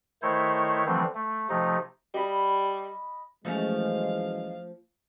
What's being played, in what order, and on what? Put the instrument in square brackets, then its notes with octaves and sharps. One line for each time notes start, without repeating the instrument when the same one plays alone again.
[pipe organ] D#3 A3 E4 C5 C#5
D3 E3 F3 G3 A3 C4
A3
C3 F3 A3 D#4
[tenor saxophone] G3 [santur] D#5 B5
[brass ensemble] F#1 E3 G#3 [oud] F3 A3 C#4 [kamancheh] F5